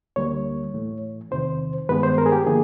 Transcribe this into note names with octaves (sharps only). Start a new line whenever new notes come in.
D2 D3 G3 A#3 C#5
A2 E3 A3
E2 C3 D#3 C5
G2 D#3 G#3 B3 B4
C5
A#4
G#4
G4
D3 F3 A#3 G#4